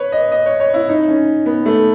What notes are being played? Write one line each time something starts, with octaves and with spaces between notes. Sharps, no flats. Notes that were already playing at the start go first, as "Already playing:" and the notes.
Already playing: B4 C#5
D#5
D#5
C#5
C#5
E4
D#4
C#4
B3
A3